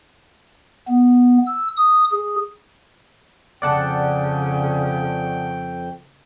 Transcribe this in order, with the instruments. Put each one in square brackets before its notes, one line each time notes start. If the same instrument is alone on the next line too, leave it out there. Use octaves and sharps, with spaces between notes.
[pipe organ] B3
E6
D#6
G#4
[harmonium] F2 G5 [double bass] C#3 [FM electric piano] D5 F#5 A5